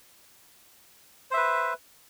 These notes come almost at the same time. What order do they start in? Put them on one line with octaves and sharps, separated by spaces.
C5 E5 B4